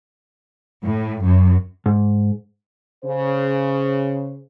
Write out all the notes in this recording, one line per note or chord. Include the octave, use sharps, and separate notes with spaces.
A2
F#2
G#2
C#3 C5